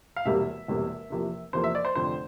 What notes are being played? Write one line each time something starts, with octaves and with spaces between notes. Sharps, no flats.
F5
E1 E2 C3 G3 A#3 E5
E1 E2 C3 G3 A#3
E2 C3 F3 A#3
E2 C3 F3 A#3 C5
E5
D5
C5
F1 F2 D3 C5